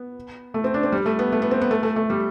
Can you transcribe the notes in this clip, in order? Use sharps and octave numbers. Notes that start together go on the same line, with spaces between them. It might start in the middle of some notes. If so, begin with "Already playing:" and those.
Already playing: B3
A3
C4
D4
C4
G3
A3
B3
A3
B3
C4
B3
A3
A3
A3
G3